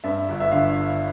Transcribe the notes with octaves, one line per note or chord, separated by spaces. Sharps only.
G2 E5
G1
E5
D3 F5